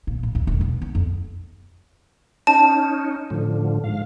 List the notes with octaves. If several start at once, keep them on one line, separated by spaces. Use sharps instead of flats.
A#2
A2
D#2
E1
B2
B3
F2
C#4 D#4 A5
A2 D3 F3
G#2 F5